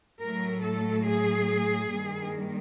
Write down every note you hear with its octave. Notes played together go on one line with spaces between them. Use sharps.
A2 F#3 A3 A#4
A4
G#4
G2 D#3 G3 A#3